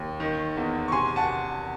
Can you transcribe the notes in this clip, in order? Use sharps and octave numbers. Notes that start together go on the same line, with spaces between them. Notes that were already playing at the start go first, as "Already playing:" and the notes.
Already playing: D#2
D#3
E2
C#6
C3 G#5 C6
F#5 A5